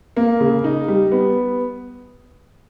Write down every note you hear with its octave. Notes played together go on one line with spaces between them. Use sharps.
A#3
C#3
D#4
G3
B3